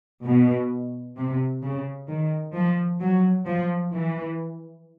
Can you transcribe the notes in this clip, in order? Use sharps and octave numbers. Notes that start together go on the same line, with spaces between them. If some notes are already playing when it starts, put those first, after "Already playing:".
B2
C3
C#3
D#3
F3
F#3
F3
E3